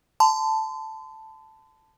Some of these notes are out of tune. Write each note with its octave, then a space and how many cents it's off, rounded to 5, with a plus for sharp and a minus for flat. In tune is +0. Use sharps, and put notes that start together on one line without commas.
A5 +0 C6 -40